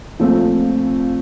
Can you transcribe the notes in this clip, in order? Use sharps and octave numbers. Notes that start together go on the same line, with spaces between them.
A#2 F3 A3 C4